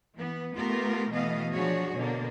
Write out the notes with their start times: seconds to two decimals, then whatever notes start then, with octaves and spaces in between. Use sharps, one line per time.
0.15 E3 B3
0.55 A3 B3 F4 G4 A#4
1.11 B2 E3 A3 B3 D#5 F5
1.52 F3 F#3 D4 F#4 G#4 C#5
1.96 B2 D3 A#3 D4